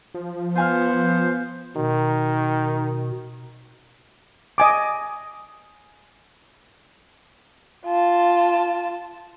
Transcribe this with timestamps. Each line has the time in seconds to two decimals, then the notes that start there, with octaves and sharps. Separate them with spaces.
0.14 F3
0.56 B3 F4 C5 G#5 F6
1.76 B2 D#3
4.58 D#5 G#5 D6
7.86 F4 A5